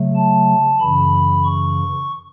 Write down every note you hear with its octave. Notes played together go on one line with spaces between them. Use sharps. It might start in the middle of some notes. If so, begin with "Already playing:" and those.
Already playing: C#3 F#3 A3
A5
F#2 C#3 E3 B5
C#6